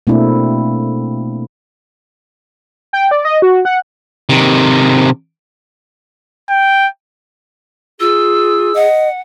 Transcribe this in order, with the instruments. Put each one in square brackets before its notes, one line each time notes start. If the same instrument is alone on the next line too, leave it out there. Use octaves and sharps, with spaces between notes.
[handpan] B2 A3 A#3 C4 D4 E4
[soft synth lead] G5
D5
D#5
F#4
F#5
[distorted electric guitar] C3 D#3
[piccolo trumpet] G5
[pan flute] F4 [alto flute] G#4 [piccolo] E6
[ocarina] D#5 [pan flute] F#5